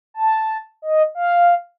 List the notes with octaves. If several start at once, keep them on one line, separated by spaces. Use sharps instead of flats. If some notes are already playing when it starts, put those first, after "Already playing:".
A5
D#5
F5